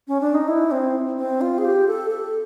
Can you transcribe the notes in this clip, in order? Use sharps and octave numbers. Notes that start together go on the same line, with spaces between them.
C#4
D4
D#4
E4
C4
C4
F4
G#4
G4
A4
A4